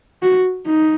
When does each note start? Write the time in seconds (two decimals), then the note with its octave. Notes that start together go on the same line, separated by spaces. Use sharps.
0.22 F#4
0.66 D#4